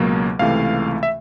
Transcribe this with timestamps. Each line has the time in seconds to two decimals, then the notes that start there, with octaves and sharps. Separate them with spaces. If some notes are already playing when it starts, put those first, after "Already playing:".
Already playing: C#2 B2 F#3 A#3
0.39 C#2 C3 E3 A3 F5
1.03 E5